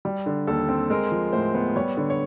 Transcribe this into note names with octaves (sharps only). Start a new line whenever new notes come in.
G3
D3
D#2 A4
C4
G#3 A#4
F3
A2 C5
B3
G3 C#5
D3
C#5